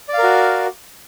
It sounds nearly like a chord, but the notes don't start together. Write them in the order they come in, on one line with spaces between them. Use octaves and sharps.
D5 F5 A#4 F#4